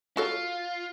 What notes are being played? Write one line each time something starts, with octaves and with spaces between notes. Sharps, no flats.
F4 F#4 A4 C#5